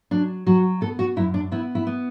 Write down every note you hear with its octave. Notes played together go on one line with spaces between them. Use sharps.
F#3 D4
F#3 F#4
B3 A4
F#4
F#2 E4
D4
B3 E4
E4
B3